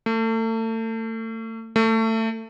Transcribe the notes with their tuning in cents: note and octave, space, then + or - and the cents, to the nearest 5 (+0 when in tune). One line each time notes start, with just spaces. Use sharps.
A3 +35
A3 +25